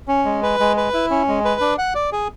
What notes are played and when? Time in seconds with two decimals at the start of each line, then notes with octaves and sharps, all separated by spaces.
0.08 C#4
0.25 G#3
0.43 B4
0.60 G#3
0.77 B4
0.94 E4
1.11 C#4
1.28 G#3
1.45 B4
1.61 D4
1.78 F#5
1.95 D5
2.12 G#4